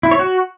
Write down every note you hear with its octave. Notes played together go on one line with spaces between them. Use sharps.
E4
C#5
F#4